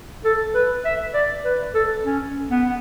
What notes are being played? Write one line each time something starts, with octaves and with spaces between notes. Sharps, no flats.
A4
B4
E5
D5
B4
A4
C#4
B3